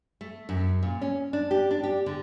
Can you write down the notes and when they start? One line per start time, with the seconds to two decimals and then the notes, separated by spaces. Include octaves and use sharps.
0.21 A3
0.49 F#2
0.83 A#2
1.02 C#4
1.33 D4
1.51 G4
1.71 D4
1.83 G4
2.06 D3